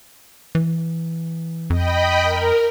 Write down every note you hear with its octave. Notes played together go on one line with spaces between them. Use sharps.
E3
F2 D#5 G5 B5
A#4